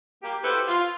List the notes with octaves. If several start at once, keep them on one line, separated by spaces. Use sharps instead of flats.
A#3 G4
E4 F#4 G4 A4 B4 C5
F4